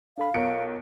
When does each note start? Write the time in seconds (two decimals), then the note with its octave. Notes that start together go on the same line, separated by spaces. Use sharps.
0.18 D4 A4 F5 B5
0.34 B1 F4 A#4 C#5 C#7 D7